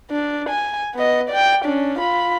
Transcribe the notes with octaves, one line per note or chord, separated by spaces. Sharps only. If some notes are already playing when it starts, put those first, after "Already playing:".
D4
G#5
B3 D#5
D5 G5
C#4 D4
F4 B5